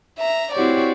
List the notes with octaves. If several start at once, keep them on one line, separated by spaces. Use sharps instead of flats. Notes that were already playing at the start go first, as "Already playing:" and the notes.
E5 A#5
C4 E4 F#4 G4 C#5 D5